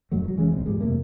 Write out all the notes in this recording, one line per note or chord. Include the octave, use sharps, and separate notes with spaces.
D#1 F#2 F#3 A3
A#2 F#3
F1 E3 G#3 C#4
D1 B1 C4
G#2 F3 G3 G#3
F2 C3 A3 A#3